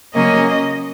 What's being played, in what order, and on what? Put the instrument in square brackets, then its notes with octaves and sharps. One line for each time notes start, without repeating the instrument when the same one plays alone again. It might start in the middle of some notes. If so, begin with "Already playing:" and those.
[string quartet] C#3 F#3 A#3 C#4 D#5